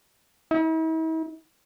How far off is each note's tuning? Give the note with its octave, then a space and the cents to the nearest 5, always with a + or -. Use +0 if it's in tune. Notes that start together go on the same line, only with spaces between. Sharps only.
E4 -45